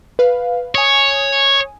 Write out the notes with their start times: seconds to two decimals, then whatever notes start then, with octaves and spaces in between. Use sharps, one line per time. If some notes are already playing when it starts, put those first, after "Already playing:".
0.19 B4 F5
0.75 C#5 G#5 D#6